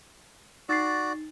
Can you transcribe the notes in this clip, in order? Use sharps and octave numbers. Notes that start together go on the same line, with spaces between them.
D#4 F#4 D5 A6 C7